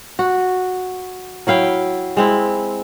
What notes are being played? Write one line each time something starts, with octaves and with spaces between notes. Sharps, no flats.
F#4
F#3 E4 F5 G5
G#3 C4 E4